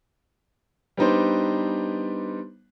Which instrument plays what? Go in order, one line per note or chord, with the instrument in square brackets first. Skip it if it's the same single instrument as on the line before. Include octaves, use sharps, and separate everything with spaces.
[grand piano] G3 B3 D4 D#4 B4 C5